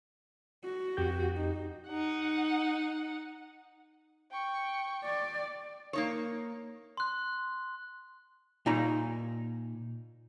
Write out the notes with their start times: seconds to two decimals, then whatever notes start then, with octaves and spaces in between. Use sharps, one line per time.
0.64 F#4
0.97 F2 G4 G6
1.37 D#4
1.88 D#4 F#5
4.32 G5 C#6
5.04 D5
5.93 A#3 D#4 C#5
6.97 C6 F#6
8.66 A#2 D#4 A#5